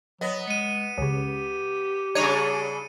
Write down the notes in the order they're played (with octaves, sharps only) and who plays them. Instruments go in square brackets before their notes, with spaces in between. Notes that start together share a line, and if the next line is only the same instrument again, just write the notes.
[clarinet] F#3 [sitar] B3 [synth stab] D#5
[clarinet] G#3 [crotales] C#7 D#7
[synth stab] C#2 C#3 [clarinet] G4
[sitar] C#3 G3 D4 [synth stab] C#5 A#5 [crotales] C#7 D#7